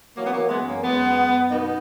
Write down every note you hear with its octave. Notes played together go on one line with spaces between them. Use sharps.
E3 F#3 A#3
B3
F#3 A#3
E3
G#3 B3
F#2
A#3 C#4
F#2 G#3 B3
F#2
F#2
B2 B3 D#4